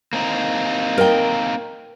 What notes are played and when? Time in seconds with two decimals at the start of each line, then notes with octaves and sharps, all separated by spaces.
0.13 A#3 C4 D#4
0.98 A#4 G5